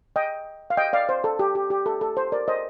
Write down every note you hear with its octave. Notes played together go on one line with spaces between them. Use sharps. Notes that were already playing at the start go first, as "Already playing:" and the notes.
D#5 G5
F5
D#5 G5
D5 F5
C5
A4
G4
G4
G4
A4
A4
C5
A#4 D5
C5 D#5